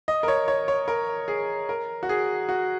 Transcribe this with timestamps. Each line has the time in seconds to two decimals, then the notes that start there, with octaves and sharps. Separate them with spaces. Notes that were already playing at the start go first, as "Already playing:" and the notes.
0.08 D#5
0.23 A#4
0.28 C#5
0.48 C#5
0.68 C#5
0.88 A#4
1.28 G#4
1.69 A#4
2.03 F#4
2.09 G#4
2.49 F#4